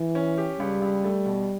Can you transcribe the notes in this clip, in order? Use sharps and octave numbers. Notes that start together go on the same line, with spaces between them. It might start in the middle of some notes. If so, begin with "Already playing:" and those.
Already playing: E3
C#4
G4
C#2 G3
C#2
A3
B2